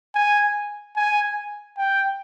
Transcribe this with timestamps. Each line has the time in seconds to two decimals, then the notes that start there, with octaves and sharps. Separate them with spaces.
0.15 G#5
0.96 G#5
1.77 G5